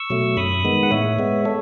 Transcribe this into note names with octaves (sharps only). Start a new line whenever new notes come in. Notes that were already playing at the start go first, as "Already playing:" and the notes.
Already playing: C#6 E6
B2 F#3 A3
F#2 B5 D#6
D#3 G#3 B3
F#5
A2 C#5 E5
G#3 B3
A4 C#5